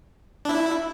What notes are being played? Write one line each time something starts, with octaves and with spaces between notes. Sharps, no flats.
D4
E4